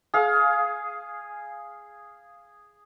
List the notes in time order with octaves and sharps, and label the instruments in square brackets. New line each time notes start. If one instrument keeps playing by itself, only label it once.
[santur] G#4 F5